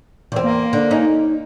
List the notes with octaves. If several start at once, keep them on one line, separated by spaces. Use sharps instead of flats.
E2 A#2 C4
A#3
D3
C#4 D#4